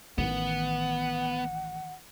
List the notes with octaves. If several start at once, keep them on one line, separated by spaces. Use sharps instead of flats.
A1 D#3 E3 B3 F#5